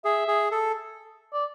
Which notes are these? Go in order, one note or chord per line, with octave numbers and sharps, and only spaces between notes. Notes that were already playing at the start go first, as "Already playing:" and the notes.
G#4 E5
G#4
A4
D5